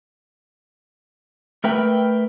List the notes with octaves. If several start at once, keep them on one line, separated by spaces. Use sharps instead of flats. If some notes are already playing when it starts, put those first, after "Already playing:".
A3 A#4 B4 E5 G5